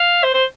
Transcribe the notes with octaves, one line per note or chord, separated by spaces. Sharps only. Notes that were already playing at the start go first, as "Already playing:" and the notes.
Already playing: F5
C5
C5